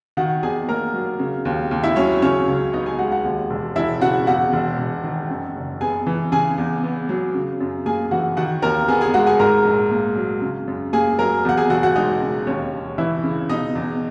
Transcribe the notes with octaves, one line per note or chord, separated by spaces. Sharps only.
D#3 F#4 F#5
E2 G#4 G#5
A#3 A#4 A#5
F#3
C#3
D#2
D#2
E4 E5
F#3 C#4 C#5
C#3 C#4 C#5
C#2
B3 D#4 D#5
G#4 G#5
G#3 F#4 F#5
F#4 F#5
D#2
E1
E1 E4 E5
C#3 F#4 F#5
E2 F#4 F#5
E1
E1
D#3
F#2
F#1
B3 G#4 G#5
E3
C#3 G#4 G#5
E2
B3
F#3
C#3
F#2
A#3 G#4 G#5
E3 F#4 F#5
D#3 F#4 F#5
D#2 A#4 A#5
B3 G#4 G#5
G#4 G#5
G#3 F#4 F#5
G#4 G#5
G#2 A#4 A#5
A#1
A#3
F#3
C#3
F#2
A#3 G#4 G#5
F#3 A#4 A#5
E2 F#5
G#4 G#5
E1 F#4 F#5
F#4 F#5
G#3 D#4 D#5
C#3
D#2 C#4 C#5
E1
E3 E4 E5
C#3
B2 D#4 D#5
E2